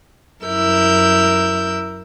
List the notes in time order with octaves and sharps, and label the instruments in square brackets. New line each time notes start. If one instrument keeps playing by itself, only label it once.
[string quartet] F#2 E4 A#4 E6 G6